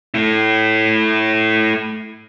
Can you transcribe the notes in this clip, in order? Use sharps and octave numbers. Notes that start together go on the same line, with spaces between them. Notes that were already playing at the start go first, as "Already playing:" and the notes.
A3 E4